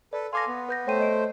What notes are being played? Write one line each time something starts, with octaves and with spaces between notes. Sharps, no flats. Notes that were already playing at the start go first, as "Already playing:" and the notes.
A4 B4 D5
A4 F5 G#5 C6 D6 A#6
B3
B4 G6 A#6
A3 C5 C#5 G5 D#7
D#5 D7